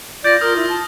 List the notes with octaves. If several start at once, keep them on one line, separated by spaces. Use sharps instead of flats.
F4 D5 G6 A#6
F4 A#4 D#6 F6
E4
A5